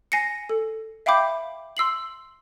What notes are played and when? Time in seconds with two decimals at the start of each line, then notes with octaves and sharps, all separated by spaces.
0.12 G#5 A#6 C7 C#7
0.49 A4
1.06 E5 F5 G5 B5 D6 G6
1.77 C6 E6 C7 F#7